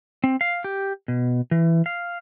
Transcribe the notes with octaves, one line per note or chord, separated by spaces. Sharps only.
C4
F5
G4
B2
E3
F5